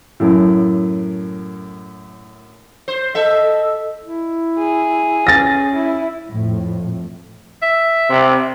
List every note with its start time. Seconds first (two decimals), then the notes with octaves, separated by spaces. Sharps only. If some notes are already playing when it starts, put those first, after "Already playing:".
0.20 F#2 A2
2.88 C5
3.15 A4 D#5 E5
4.03 E4
4.59 G#4
5.27 C#4 A6 A#6
5.75 E4
6.30 F2 A2
7.62 E5
8.10 C3